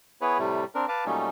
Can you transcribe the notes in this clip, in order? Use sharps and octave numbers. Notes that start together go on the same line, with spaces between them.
B3 E4 G#4 B4 C#5
A2 C3 G3 A3
C4 D4 A#4
B4 F5 A5 D6
A#2 F#3 G3 A3 C#4 D#4